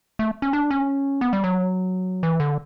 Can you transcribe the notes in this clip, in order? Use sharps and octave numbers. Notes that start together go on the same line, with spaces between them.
A3
C#4
D4
C#4
B3
G3
F#3
E3
D3